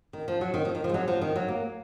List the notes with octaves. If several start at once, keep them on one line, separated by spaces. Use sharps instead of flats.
D#3
F3
F#3
D#3
F3
D#3
F3
G#3
F#3
F3
D#3
F#3
A#3